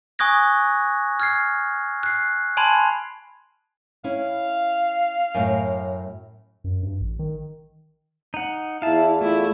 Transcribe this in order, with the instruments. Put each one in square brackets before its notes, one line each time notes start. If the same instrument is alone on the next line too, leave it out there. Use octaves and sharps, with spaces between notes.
[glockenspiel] G#5 C#6 D#6 F#6 G#6 A#6
F6 G#6 C7
F#6 C7
G#5 A5 B5 C6 G#6
[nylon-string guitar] C#4 E4 [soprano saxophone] F5
[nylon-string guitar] F#2 A2
[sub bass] F#2
G2
A1
D#3
[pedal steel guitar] D#4 F#5
[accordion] E2 [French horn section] E4 [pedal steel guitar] F5 A5
[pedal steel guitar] A3 [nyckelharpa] E4 [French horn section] F4